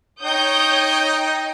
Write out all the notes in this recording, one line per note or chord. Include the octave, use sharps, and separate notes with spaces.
D#4 C#5 G5 D#6 G6